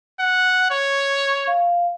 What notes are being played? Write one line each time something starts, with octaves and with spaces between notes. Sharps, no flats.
F#5
C#5
F5